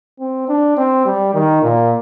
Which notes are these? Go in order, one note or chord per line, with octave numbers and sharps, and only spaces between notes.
C4
D4
C4
G3
D#3
A#2